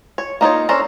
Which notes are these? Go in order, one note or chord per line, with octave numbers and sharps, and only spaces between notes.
C#5
A#3 D#4 F4 C#5
C#4 D4 A4 A#4 C5